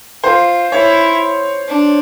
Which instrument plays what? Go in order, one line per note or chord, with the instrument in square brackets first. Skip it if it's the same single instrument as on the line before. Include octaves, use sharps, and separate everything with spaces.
[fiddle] F4 [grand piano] C5
[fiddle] E4 [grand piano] C#5
[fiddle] D4